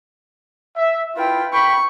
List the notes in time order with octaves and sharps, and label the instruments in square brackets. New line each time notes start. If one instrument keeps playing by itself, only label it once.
[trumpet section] E5
[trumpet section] E4 F4 [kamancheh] B4 G5
[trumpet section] G5 B5 [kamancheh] C#6